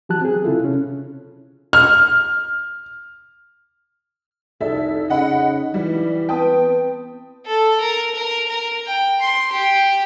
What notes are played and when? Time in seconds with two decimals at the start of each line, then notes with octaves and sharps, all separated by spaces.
0.09 E3 F#3 F#4 G4 A5 F#6
0.21 C4 G#4
0.44 C#3 E4 F4 A4
0.60 C3 C#4
1.73 F6
4.61 F1 C2 D#4 A4 E5
5.10 C#3 D#5 F#5 B5
5.74 E3 G3
6.29 B3 C4 B4 G5 A5 D#6
7.46 A4
7.81 A#4
8.15 A#4
8.48 A#4
8.87 G5
9.21 C6
9.52 G4